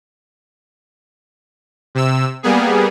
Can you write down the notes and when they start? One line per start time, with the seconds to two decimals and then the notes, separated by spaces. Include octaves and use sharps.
1.95 C3 E6
2.43 G3 A#3 B3 G#4